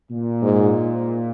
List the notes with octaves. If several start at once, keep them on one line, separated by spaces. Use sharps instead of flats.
A#2
G#2